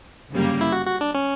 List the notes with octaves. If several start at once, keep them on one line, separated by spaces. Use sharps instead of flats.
G1 F#2 C#3 G3 A#3
E4
F#4
F#4
D4
C#4